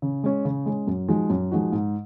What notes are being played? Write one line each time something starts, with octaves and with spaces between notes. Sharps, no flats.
C#3
G#3 C#4
C#3
G#3 C#4
F#2
F3 G#3 D#4 F#4
F#2
F3 G#3 D#4 F#4
G#2